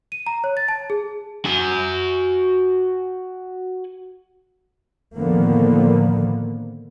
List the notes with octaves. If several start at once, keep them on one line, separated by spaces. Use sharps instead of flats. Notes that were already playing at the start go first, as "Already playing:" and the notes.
D#7
A#5
C#5
A6
A5
G#4
F#4 G#5
A2 D3 D#3 F3 A#3 B3